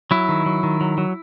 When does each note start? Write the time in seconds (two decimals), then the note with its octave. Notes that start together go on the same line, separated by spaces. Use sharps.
0.11 F#3 E4
0.29 D#3
0.46 F#3
0.63 D#3
0.81 F#3
0.98 F#3